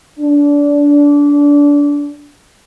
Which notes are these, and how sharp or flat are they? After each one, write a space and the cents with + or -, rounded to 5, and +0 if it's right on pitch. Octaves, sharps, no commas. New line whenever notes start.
D4 -25